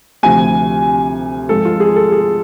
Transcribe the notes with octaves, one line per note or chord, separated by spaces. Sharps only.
D2 C3 F3 G#5
G#2 F3 A4
F4
G#4
A4
G#4